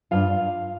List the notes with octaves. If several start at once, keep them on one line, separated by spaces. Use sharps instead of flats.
G2 F4 F5